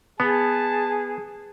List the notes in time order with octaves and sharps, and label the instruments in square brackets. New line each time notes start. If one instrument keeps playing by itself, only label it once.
[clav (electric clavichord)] B3 [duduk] G#4 [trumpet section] A5